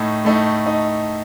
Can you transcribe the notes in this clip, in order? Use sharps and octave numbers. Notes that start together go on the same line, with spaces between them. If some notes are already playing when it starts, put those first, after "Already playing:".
Already playing: A2 A3 D#4
A2 A3 D#4
D#4